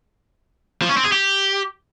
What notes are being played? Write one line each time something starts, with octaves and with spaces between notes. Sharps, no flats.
F3
C#4
C4
G#4
G4